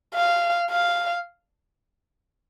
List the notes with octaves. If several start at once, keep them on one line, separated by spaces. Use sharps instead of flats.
F5
F5